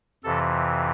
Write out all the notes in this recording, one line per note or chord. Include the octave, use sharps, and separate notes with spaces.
F2 C3 E3 A4